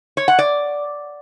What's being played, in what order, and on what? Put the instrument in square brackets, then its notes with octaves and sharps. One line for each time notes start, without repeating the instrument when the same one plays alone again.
[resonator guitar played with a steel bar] C#5
F#5
D5